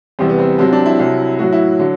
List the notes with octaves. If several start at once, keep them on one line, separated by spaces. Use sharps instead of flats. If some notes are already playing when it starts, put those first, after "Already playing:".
E2 C3 G3 C4
B3
C4
C2 C3 F#3 C4
D4
E4
C2 C3 F#3
A2 F#3 F#4
E4
D3 F#3